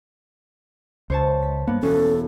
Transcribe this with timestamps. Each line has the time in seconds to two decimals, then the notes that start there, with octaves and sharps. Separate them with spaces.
1.10 C#2 C5 C#5 A5
1.42 B6
1.67 G2 A#3 B3
1.83 E1 C#4 A4